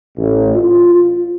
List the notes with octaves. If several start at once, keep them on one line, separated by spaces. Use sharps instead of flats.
A1
F4
F4